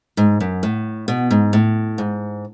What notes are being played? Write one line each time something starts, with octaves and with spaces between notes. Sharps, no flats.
G#2
F#2
A2
B2
G#2
A2
G#2